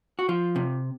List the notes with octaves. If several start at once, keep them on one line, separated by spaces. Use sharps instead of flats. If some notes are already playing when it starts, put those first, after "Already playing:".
F#4
F3 F4
C3